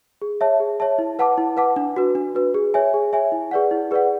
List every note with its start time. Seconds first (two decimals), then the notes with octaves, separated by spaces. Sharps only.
0.22 G#4
0.41 C#5 E5 A5
0.60 G#4
0.80 C#5 E5 A5
0.98 E4
1.19 B4 F#5 A5 D6
1.38 E4
1.57 B4 F#5 A5 D6
1.76 D4
1.96 F#4 B4
2.15 D4
2.35 F#4 B4
2.54 G#4
2.74 C#5 E5 G#5
2.94 G#4
3.13 C#5 E5 G#5
3.32 E4
3.51 G#4 B4 D5 F#5
3.71 E4
3.91 G#4 B4 D5 F#5